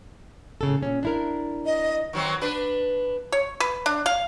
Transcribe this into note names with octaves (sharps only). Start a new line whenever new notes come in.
A2 C#3 A4
A#2 C#4
D4 E4 A#4
D#5
D#3 F#3 C4
D4 B4
C#5
B4
D4
F5